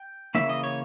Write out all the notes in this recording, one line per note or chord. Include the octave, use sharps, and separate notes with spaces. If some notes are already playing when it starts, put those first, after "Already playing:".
Already playing: G5
C#3 E3 A#3 C#4 E5
D#5
C#5